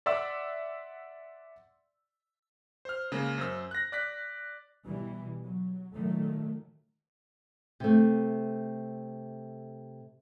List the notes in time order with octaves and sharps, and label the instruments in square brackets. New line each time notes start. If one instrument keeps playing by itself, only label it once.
[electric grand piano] D5 E5 F#5 C6 E6
C5 F6
C#3 G#3 A#3
F#2 C5 E6
F#6 A#6
D5 F#6 B6
[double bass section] B2 E3 G3
F#3
A#2 D#3 F#3 A3
[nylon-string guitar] C3 A3